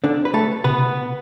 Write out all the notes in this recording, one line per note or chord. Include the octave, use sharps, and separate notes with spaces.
D3 D4
B4
A3 A4
C3 B3 B4